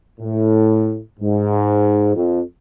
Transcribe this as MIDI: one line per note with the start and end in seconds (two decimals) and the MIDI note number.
0.20 0.98 45
1.20 2.12 44
2.15 2.41 41